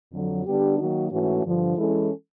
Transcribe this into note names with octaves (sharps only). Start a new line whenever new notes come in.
F2 D3 F#3
D3 G3 B3 D4 G4
D#3 F#3 A#3 D#4 F#4
G#2 E3 A3 C#4 F#4
G2 D3 F3
E3 G#3 C#4 E4 A4